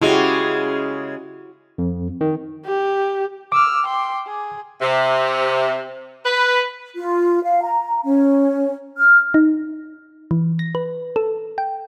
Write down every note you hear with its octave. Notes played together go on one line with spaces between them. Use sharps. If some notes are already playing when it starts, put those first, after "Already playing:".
C#3 G#3 E4 F#4 G4
F2
D#3
G4
D6 E6 F6
G5 C6
G#4
C3
B4
F4
F5
A#5
C#4 C#5
F6
D#4
E3
A#6
B4
A4
G5